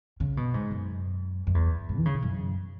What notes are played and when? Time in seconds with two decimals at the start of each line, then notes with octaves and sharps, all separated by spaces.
0.20 C#3
0.37 B2
0.54 G#2
0.71 F#2
1.47 F#2
1.55 E2
1.89 G#2
1.97 E3
2.05 C#3
2.14 B2
2.22 F#2